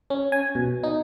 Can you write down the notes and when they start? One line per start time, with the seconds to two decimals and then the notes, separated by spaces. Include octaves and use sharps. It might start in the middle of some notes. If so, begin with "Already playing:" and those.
0.10 C#4
0.32 G#5
0.55 B2
0.83 D#4